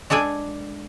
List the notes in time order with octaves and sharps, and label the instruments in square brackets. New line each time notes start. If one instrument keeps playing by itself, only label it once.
[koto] G#3 D4 A4 D5 G#5